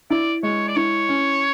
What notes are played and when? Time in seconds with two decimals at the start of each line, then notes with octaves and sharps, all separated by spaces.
0.10 E4 D5
0.43 G#3 C#5
0.68 D5
0.76 E4 C#5
1.09 C#4